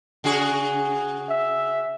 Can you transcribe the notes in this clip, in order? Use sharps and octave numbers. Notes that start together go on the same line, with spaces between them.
C#3 F#4 G#4
E5